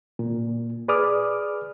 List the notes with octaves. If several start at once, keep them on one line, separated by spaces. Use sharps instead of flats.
A#2
G#4 B4 D5 D6 D#6 F6